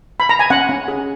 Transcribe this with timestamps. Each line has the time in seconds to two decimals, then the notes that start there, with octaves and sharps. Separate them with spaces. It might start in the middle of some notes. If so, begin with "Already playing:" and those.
0.20 B5
0.29 A#5
0.39 G#5
0.50 C#4 F#5
0.69 C#4
0.88 G#4